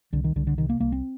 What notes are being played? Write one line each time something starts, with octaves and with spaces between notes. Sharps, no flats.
C2 D3
D#3
C2 D3
D3
C3 D#3
A#3
C2 A#3
C4